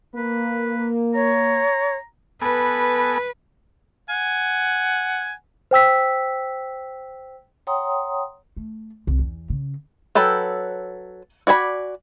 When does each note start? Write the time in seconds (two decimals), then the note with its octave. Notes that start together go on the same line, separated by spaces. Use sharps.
0.16 A#3 B4
1.15 C#5 A#5
2.41 B3 A4 B4 G#5
4.10 F#5 G#5
5.71 C5 G5 E6 B6
7.67 C#5 F#5 G5 A#5 C6 D#6
8.56 A3
9.07 C2
9.19 E2
9.50 C#3
10.15 F#3 A4 B4 G5
11.47 F#4 D5 G#5 B5